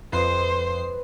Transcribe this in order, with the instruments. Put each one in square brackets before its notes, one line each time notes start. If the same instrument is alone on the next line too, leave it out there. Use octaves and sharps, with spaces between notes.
[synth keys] F2 C7 [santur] B4 D#5 [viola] C5